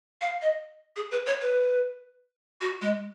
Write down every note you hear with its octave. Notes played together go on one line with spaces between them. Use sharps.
F5
D#5
G#4
B4
C#5
B4
F#4
G#3